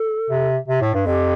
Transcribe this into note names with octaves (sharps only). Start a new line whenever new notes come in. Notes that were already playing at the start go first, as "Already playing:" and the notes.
Already playing: A4
C3
C3
A2
G2
F2 G4